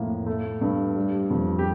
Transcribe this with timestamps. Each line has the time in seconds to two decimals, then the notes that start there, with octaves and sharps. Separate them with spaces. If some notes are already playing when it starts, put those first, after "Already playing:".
Already playing: F2 A2 A#3
0.26 A3
0.61 G2
0.96 G3
1.31 F2
1.59 G4